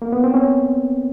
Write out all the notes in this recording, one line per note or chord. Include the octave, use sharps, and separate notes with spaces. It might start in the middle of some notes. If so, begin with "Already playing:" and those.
A#3
B3
C4
C#4